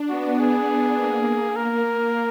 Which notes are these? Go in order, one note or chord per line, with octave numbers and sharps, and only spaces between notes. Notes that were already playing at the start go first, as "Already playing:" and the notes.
Already playing: D4
B3 F#4
G#4
A#3
A#4